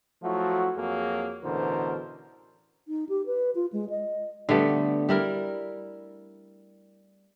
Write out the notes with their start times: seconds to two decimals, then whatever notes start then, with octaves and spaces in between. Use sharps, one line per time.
0.23 F3 F#3 A3 E4 F#4
0.77 F2 F#3 A#3 G#4
1.44 A1 B2 D3 E3 A#4 C5
2.88 D#4
3.09 G4
3.26 B4
3.55 F4
3.73 G#3
3.90 D#5
4.49 D3 G3 A3 B3
5.09 G3 E4 A#4